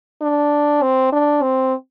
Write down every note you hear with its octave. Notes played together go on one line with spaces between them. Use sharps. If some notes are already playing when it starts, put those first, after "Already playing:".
D4
C4
D4
C4